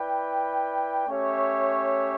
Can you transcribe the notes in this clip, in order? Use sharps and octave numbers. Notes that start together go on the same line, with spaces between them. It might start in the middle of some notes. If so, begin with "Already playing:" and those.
Already playing: E4 B4 D5 G5
A3 C#4 G4 C#5 E5